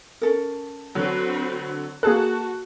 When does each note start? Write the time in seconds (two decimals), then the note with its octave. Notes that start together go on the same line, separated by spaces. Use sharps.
0.21 C#4 A4 A#4
0.95 D3 F#3 C4 F#4 B4
2.03 A#3 F#4 G#4 A4 A5 F#6